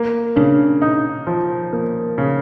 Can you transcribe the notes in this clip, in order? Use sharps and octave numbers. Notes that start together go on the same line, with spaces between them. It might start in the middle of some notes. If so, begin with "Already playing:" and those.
Already playing: A#3
C#3 D4
D#4
F3
A#3
C#3